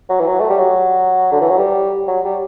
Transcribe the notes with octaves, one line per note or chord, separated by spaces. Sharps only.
F#3
E3
F#3
A3
G3
F#3
D3
E3
F#3
G3
F#3
G3